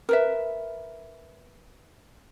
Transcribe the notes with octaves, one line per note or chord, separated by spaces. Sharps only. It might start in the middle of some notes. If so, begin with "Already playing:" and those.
A#4 B4 E5